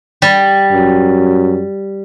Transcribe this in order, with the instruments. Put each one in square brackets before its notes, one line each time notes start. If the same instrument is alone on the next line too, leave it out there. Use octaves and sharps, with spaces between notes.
[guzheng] G3
[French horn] F#2